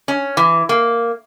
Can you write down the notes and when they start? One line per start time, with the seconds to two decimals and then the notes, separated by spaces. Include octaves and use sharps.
0.08 C#4
0.37 E3
0.69 A#3